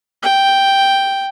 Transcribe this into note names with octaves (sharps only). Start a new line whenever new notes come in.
G5